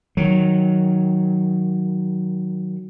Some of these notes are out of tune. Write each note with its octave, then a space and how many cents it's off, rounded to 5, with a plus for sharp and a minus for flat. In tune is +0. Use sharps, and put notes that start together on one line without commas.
D#3 +0 F#3 +0